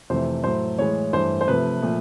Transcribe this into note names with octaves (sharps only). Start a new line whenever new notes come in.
F2 C3 E3 A3 C5
A2 F#3 A3 C5
A2 E3 G#3 C#5
G2 E3 A3 C5
C5
C3 F3 A3 B4
A#2 F3 A3